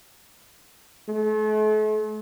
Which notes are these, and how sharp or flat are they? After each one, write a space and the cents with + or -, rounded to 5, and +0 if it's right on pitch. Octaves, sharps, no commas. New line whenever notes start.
A3 -40